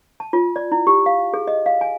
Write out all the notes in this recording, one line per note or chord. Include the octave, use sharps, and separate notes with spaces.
A5
F4
D5
E4
G4
F5
G#4
D#5
F5
G#5